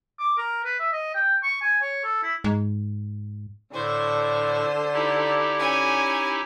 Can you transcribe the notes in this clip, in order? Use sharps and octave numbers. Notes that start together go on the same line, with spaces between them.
D6
A#4
B4
E5
D#5
G5
C#6
G#5
C#5
A4
E4
G#2
A2 D3 C5 C#6
D#4 E4 G4
C#4 G#5